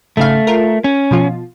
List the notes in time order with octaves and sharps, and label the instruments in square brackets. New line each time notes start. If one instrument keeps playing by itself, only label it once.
[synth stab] G#1 C#3 F5 [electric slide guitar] A3
[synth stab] F4 A#4
[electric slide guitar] C#4
[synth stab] B2 F3 F4